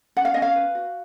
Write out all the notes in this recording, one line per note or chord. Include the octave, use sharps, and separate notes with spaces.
C#4 F#5
F5
C#4 D#5
F5
B4
F#4